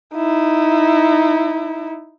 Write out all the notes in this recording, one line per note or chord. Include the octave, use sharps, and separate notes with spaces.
D#4 E4